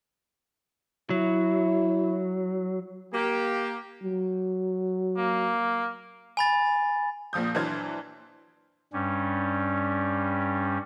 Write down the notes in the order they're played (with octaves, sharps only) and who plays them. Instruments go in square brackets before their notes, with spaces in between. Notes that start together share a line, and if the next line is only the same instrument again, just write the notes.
[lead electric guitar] F#3 [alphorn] E4
[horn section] A#3 G4
[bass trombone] F#3
[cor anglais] A#3
[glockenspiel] G#5 B5 A6
[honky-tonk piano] A#1 A#2 F3 D#6 G6
E3 F#3 D4 C5 F6 G#6
[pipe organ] G2 G3 C#4